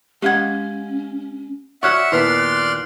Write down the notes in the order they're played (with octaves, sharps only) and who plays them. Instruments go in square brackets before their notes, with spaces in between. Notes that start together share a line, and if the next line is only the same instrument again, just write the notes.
[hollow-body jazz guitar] G#3 F5 F#5 [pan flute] C#4 [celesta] G4 G#6
[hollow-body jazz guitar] F#4 C#5 D5 [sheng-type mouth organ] E5 F#5 [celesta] C#6 F6 [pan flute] F#6
[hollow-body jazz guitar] D#2 A#2 B3 [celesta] E4 B4 [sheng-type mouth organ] D5 C6 F6